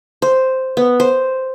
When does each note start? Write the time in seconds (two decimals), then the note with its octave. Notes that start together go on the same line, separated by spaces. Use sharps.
0.22 C5
0.77 B3
1.00 C5